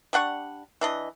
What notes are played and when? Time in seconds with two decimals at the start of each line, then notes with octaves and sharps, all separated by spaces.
0.13 G3 D4 F#5 C#6
0.81 E3 D4 D#5